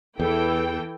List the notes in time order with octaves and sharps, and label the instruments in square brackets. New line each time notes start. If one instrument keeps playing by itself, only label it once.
[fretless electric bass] E2 [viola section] E3 A4 G5